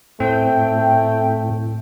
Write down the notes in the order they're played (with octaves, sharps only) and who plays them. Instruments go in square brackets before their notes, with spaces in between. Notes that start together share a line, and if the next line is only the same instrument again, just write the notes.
[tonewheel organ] A2 [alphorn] A3 [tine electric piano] C4 [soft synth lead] G5